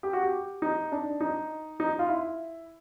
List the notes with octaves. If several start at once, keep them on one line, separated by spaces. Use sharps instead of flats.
G4
F#4
G4
D#4
D4
D#4
D#4
F4
E4